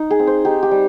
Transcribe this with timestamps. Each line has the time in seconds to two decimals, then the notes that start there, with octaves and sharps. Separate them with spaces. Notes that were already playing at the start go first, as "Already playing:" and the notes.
Already playing: D#4
0.11 G#4
0.19 C4
0.27 C5
0.45 D#4 G4
0.63 G4
0.71 G3